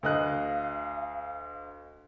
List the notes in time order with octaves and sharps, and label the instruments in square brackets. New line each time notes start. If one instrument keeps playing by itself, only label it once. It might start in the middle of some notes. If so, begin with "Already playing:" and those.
[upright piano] D2 D#5 F#6 [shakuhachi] F5